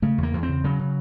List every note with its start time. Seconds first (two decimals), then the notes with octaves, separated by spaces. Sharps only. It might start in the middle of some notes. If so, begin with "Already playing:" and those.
0.02 C#3 A3
0.18 E2
0.23 A#3
0.34 E2
0.43 C4
0.49 C#3
0.64 C#3 F#3
0.79 C#3